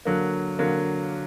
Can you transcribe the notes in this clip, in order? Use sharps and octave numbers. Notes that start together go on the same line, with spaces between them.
D3 F#3 A#3
D3 F#3 A#3